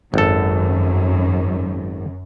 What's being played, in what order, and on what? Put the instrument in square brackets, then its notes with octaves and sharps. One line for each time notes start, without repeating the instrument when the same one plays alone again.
[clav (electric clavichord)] G#1 A4 [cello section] F#2